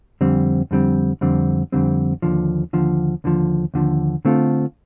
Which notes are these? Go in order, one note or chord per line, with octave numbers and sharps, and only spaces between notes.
F2 D3 G3 C4
F2 D3 G3 C4
F2 D3 G3 C4
F2 D3 G3 C4
D#2 D3 F3
D#2 D3 F3
D#2 D3 F3
D#2 D3 F3
D3 A3 C4 F4 A4